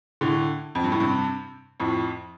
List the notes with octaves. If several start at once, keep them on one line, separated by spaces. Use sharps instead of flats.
A2 D3
F2
G2
A2
G2 C3
F2 A2